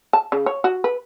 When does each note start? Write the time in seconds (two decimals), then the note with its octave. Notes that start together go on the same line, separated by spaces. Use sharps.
0.13 A5
0.32 C#3
0.46 C#5
0.64 F#4
0.84 B4